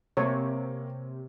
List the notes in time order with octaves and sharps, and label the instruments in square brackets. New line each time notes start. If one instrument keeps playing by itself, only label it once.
[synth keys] C3 [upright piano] A#3 [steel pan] C#5